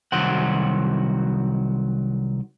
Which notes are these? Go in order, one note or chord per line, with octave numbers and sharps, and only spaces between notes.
C2 D#3 F#3 F#4 C5 F#5